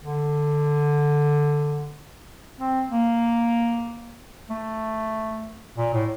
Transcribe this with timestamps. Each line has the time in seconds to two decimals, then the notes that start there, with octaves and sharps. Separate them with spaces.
0.03 D3
2.59 C4
2.90 A#3
4.50 A3
5.78 A#2
5.94 A2